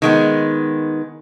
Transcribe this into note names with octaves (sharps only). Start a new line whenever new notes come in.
D#3 G#3 B3